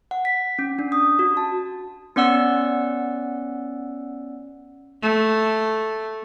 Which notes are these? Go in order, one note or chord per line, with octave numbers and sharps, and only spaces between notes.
F#5
B6
C#4
D4
D#6
F#4
A5
B3 C#4 D5 F#5 E6
A3